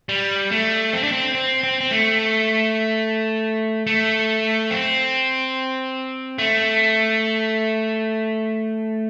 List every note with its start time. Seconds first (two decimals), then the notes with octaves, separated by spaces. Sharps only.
0.09 G3
0.52 A3
0.93 C4
1.03 D4
1.12 C4
1.35 C4
1.64 C4
1.81 C4
1.91 A3
3.87 A3
4.71 C4
6.39 A3